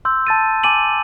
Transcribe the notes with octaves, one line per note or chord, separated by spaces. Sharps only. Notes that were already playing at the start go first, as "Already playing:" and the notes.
C6 E6 G6
A5 A6 D#7
G#5 D6 D#7 F#7